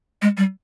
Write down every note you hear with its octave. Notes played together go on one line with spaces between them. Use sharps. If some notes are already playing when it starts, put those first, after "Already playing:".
G#3
G3